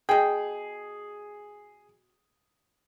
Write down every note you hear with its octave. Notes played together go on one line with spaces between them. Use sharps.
B2 G#4 G5